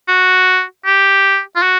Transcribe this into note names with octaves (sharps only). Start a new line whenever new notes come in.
F#4
G4
F4
F#4